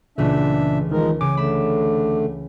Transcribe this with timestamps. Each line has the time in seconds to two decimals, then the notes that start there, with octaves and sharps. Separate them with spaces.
0.18 C#2 A#2 C#3 E3 A3 D4 E5
0.92 D#3 F3 G#3 A#4
1.21 C#3 G#5 D6
1.37 D3 A3 B5 E7